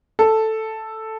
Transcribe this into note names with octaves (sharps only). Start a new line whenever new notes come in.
A4